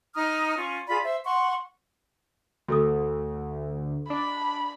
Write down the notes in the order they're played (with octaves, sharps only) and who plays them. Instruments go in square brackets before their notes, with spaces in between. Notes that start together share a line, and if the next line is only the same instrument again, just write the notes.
[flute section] D#4 A#5 D#6 F6
C#4 F4
F4 G#4 D5 B5
C5 E5
F#5 C6 C#6
[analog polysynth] D2 [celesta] F#4 A4 D#6
[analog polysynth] D4 [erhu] B5